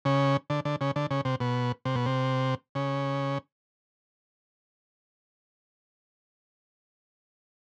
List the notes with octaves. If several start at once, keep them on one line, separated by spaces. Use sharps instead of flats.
C#3
D3
D3
C#3
D3
C#3
C3
B2
C3
B2
C3
C#3